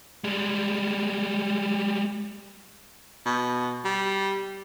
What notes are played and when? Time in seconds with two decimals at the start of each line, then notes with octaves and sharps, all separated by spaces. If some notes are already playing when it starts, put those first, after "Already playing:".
0.24 G3 G#3
3.25 B2
3.84 G3